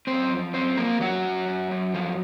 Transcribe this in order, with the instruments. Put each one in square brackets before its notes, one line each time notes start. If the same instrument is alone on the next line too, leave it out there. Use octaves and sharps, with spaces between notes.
[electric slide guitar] F#2 C4 C5
F3
F#2 C4 C5
F3 A#3 A#4
F#2 F#3 F#4
F#2
F#2
F#2
F3